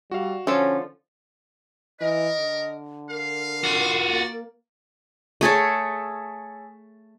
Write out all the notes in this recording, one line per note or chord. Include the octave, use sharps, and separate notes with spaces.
G3 F#4 F5
D3 F3 C#4 A4
E3 A#4 D#5
D3
A#4 F5
F4 F#4
A#3 D5
A3 G#4 A4 C#5